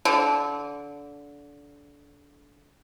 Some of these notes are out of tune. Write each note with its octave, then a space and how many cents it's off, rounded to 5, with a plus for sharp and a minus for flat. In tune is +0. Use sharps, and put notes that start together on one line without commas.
D3 -25